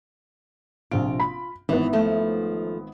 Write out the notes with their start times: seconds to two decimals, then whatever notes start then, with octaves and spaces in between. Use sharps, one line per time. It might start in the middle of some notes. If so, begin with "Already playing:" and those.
0.91 A#1 C3 F4 D7
1.20 B5
1.69 G#1 E3 B3
1.93 F3 A3